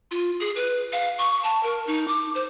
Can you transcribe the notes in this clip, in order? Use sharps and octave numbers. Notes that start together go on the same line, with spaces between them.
F4
G#4
B4
F5
C#6
A5
A#4
D#4
D6
C5